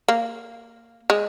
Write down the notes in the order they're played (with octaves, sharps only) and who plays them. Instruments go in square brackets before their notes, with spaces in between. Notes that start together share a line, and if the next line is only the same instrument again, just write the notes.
[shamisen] A#3
G#3